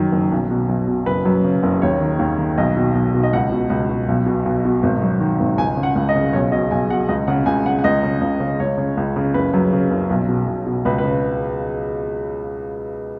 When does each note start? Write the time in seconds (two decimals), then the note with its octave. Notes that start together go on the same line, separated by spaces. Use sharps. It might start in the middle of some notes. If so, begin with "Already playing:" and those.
Already playing: F#1 F#2 D#3
0.12 F#1
0.32 B1
0.51 B2
0.69 B1
0.88 B2
1.06 F#1 B4
1.25 F#2
1.44 C#3
1.63 F#1
1.82 D#2 C#5
2.01 D#3
2.19 D#2
2.38 D#3
2.58 B1 D#5
2.77 B2
2.95 B1
3.14 B2
3.23 D#5
3.33 C#2 F#5
3.52 B2
3.70 C#2
3.89 B2
4.08 B1
4.26 B2
4.45 B1
4.65 B2
4.83 G#1
5.02 F#2
5.20 D#3
5.40 G#1
5.58 C#2 G#5
5.77 C#3
5.83 F#5
5.96 C#2
6.09 D#5
6.15 C#3
6.33 B1 C#5
6.52 B2 D#5
6.71 B1 G#5
6.90 B2 F#5
7.09 C#2 D#5
7.27 C#3 F#5
7.46 C#2 G#5
7.65 C#3 F#5
7.79 F#5
7.84 C#2 D#5
8.03 C#3
8.21 C#2
8.40 C#3
8.60 C#2 C#5
8.78 C#3
8.97 C#2
9.16 C#3
9.34 F#1 B4
9.54 F#2
9.73 C#3
9.90 F#1
10.10 B1
10.29 B2
10.47 B1
10.66 B2
10.85 C#2 B4
10.98 B4
11.04 C#3